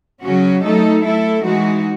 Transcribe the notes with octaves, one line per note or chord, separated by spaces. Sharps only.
C#3 F#3 C#4 F#4
F#3 A3 D#4 A4
A3 E4 A4
E3 G#3 D#4 F#4